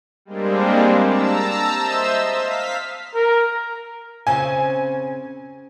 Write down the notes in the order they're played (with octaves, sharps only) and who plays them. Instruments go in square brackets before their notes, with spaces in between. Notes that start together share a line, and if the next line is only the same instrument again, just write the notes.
[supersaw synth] G3 G#3 A#3 C4 D4
A5 A#5 E6
C5 D#5 E5 E6
F5 B6
[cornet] A#4
[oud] C#3 C4 C#4 [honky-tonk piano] G#5